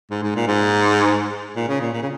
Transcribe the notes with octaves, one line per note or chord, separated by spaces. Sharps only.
G#2
G#2
A#2
G#2
A#2
C#3
A#2
A#2
C#3